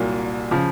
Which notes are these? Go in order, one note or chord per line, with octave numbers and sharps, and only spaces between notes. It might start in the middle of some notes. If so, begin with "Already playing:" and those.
Already playing: C2 A#2 F#3
C#3 F3